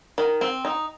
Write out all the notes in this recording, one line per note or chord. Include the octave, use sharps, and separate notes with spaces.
D#3
C4
D#4